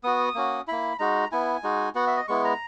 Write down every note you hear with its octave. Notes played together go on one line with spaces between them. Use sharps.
B3 F#4 D#6
A#3 C#4 F#4
A#3 E4 B5
G#3 D#4 F#4 A#5
B3 E4 G#5
G#3 D#4 F#4
B3 F#4 F#5
E5
D#5
G#3 B3 E4 C#6
A#5